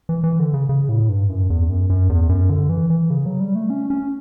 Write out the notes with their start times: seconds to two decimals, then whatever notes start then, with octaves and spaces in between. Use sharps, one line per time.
0.09 E3
0.24 E3
0.39 D3
0.54 C#3
0.69 C#3
0.89 A2
1.09 G2
1.29 F#2
1.50 E2
1.69 F#2
1.90 F#2
2.09 E2
2.29 F#2
2.50 D3
2.69 E3
2.90 E3
3.10 C#3
3.26 F#3
3.40 G3
3.55 A3
3.70 C#4
3.90 C#4